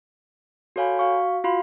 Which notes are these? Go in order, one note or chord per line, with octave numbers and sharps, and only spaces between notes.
F#4 A4 C#5 F5 G#5 B5
F#4 F5 C#6
F4 F#4 F5 B5 C6